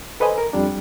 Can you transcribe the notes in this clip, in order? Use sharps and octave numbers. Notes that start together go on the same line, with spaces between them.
A4 B4 C5 D#5 G#5
A#4
F2 G3 D4